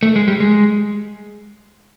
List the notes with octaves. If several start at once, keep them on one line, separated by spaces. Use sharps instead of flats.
A3
G#3
G3
G#3